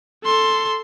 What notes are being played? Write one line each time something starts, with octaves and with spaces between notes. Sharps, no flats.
A4 C6